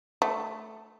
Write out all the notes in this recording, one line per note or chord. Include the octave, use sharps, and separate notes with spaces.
A3